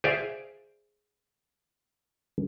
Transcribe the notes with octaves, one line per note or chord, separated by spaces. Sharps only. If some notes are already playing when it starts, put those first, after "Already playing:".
G#4 C5 D5 E5 F5